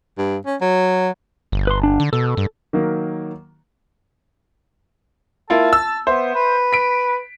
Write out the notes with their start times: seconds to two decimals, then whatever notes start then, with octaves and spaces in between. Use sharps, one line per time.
0.18 G2
0.46 C#4
0.61 F#3
1.52 G1
1.67 B4 C6
1.83 D4
2.00 D3
2.13 B2 A4
2.37 G2
2.73 D#3 F#3 A#3
5.50 A#3 E4 F4 A5
5.73 E6
6.07 B3 C5 E5
6.35 B4
6.73 B6 D7